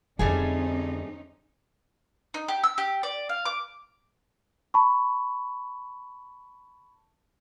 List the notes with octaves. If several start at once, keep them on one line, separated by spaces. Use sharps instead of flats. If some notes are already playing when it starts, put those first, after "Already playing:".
F2 D3 G3 A3 C4 C#4 D#4 G#4
D#4
G4
E6
G4
D5
F5
D6
A5 B5 C#6